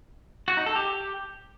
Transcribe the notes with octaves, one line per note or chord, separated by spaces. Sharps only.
F#4
D#4
A4
G4